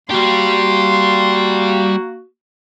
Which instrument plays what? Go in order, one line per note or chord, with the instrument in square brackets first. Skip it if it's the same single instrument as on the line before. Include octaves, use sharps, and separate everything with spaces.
[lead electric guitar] G3 G4 [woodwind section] A#3 F#4 [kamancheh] C6